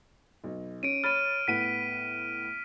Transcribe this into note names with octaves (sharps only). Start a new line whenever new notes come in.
B1
C#4 D7 D#7
C#5 B5 F6 A6 D#7
A2 B3 B6 D#7